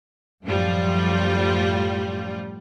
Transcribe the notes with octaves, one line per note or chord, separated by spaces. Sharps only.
F#2 A2 F3 G3 F4